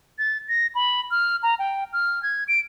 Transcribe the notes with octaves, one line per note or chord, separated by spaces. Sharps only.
A6
A#6
B5
F6
A#5
G5
F6
G#6
D7